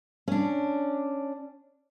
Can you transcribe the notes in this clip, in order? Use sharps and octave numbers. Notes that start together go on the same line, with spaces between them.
C#4 D4